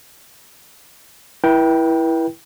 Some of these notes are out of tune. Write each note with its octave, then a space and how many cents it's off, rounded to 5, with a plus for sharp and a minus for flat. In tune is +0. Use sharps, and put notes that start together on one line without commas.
E4 +0 B4 -40 G5 -5